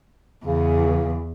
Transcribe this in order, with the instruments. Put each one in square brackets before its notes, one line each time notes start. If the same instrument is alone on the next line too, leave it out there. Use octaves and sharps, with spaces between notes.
[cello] E2 [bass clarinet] C#3